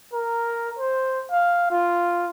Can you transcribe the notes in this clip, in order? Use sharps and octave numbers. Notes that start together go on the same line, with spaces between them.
A#4
C5
F5
F4